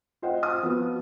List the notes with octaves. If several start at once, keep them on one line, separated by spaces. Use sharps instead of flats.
F4 C5 D#5 F#5 G5
D#6
F3 B3 F#4